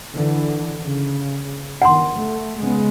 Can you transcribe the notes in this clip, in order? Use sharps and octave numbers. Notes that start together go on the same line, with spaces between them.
D3 E3
C#3
G1 D#3 F#5 A#5 C6
A3
C#3 G#3 B3